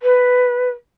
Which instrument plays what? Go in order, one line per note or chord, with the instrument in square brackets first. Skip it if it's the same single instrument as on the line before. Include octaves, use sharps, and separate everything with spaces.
[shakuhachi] B4